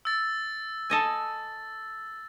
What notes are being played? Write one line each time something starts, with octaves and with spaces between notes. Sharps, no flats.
E6 A6
A4 D#5 G#5